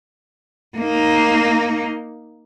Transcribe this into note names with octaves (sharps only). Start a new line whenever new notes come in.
A#3 D#4